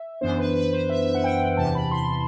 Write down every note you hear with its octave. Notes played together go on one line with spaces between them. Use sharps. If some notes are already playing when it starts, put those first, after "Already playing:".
Already playing: E5
F#2 E3 B3 D4 C5
B4
B4
C5
E5
E5
F#5
G5
E2 C3 E3 A5
B5
C6